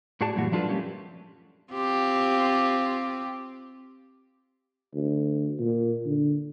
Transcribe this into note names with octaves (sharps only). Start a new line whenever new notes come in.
A2 F#4 G#4 D5 A5
F#2 A#2 E3 G3 F#4
F3 G3 D4 F4 A4 B4
G3 A3 A#3 C#4 G4
C4 F4 G4
D2
A#2
D3